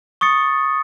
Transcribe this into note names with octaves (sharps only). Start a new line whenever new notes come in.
C#6 D#6 A6 C#7